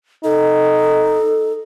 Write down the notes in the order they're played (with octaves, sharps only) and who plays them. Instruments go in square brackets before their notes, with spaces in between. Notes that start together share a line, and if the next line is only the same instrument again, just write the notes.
[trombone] D#4 [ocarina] A4